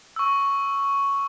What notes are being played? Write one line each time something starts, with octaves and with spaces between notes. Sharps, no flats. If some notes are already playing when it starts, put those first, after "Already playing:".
C#6 E6